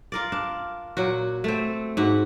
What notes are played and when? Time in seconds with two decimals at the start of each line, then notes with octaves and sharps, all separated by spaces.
0.12 F4 A#4 D5
0.32 D4
0.97 A#2 F#3 F#4
1.44 A3 C4
1.97 G#2 F#4